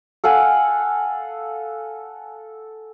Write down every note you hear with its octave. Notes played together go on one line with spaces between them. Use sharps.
A4 F5 F#5 G#5